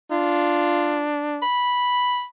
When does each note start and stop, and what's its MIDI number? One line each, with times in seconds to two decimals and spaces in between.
0.11 1.43 62
0.11 1.06 65
1.42 2.24 83